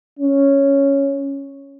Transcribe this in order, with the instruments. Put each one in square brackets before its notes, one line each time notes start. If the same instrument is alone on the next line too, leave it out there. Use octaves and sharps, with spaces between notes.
[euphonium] C#4